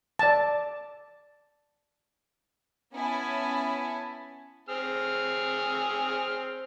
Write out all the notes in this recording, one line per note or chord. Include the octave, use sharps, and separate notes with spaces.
D5 A5
B3 C#4 E4 G#5 A5
C4 G#4 F6